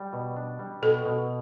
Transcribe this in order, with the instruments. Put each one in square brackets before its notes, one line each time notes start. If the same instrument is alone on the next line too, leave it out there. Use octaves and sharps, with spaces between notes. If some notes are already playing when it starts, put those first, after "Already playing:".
Already playing: [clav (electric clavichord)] G3
B2
D4
G3
[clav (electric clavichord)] B2 [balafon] A4
[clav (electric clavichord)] B2